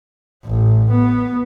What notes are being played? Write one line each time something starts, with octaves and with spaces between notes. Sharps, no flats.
A1
B3